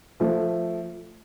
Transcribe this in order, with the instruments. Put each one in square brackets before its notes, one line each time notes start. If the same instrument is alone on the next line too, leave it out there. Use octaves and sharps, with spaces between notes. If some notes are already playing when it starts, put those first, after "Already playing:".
[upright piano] F3 A3